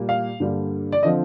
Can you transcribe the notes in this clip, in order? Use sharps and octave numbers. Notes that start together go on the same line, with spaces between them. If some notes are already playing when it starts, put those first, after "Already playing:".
Already playing: A#2 G3 A#3
F5
G2 D3 G3 A#3
D5
D3 F3 C4 D#5